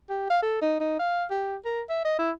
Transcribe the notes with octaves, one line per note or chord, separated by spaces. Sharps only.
G4
F5
A4
D#4
D#4
F5
G4
A#4
E5
D#5
E4